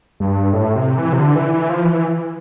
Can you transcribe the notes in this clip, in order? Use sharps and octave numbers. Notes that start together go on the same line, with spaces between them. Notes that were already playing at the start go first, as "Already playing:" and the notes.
G2
A2
C3
E3
C3
D3
E3
E3
F3
E3